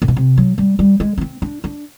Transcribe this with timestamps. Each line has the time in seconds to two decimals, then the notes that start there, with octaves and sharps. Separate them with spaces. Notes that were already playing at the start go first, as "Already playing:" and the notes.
0.02 A#2
0.08 B2
0.16 C3
0.37 F#3
0.58 G3
0.79 G3
1.00 G#3
1.18 C#4
1.21 C4
1.42 D4
1.64 D4